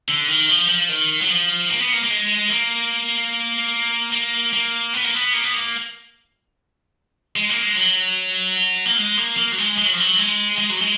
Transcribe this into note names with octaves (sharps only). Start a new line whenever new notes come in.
D3
D#3
F3
F3
D#3
F#3
F3
A#3
B3
A#3
A#3
G#3
A#3
A#3
A#3
B3
A#3
B3
A#3
B3
A#3
G#3
A#3
G#3
F#3
A#3
G#3
A#3
A#3
F#3
G#3
G#3
F#3
F3
F#3
G#3
G#3
F#3
G#3